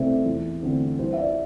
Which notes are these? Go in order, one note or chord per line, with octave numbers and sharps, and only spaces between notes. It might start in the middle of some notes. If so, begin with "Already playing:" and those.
Already playing: C2 C3 A3 C4 C5 D5 E5
E2
D3 A3 C4
C2 C5
E5
D5